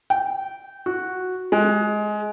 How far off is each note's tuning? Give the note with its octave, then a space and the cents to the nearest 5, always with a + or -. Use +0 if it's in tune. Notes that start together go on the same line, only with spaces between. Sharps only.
G5 -20
F#4 -5
G#3 +15